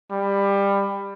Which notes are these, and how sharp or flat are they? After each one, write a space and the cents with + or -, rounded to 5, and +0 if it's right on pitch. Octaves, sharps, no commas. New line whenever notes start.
G3 +20